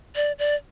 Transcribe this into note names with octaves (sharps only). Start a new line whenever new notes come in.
D5
D5